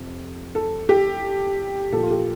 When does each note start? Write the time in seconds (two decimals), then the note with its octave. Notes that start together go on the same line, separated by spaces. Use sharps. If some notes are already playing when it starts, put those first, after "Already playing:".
Already playing: F2 C3
0.55 A4
0.89 G4
1.92 A#2 F3 A4
2.03 F4
2.11 G4